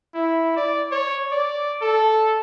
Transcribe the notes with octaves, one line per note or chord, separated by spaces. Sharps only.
E4
D5
C#5
D5
A4